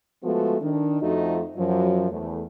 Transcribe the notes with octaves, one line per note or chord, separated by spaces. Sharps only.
F3 G#3 A3 B3 F#4 A4
D#3 D4
F2 F3 A3 D#4 F#4
F#2 F3 F#3
E2 A3